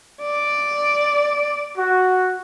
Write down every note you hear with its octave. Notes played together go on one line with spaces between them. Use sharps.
D5
F#4